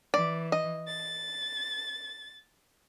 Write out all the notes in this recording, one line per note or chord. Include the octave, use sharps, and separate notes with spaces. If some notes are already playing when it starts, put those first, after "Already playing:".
E3 D5
D#5
A6